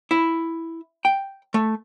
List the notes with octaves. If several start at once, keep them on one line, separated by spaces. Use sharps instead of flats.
E4
G5
A3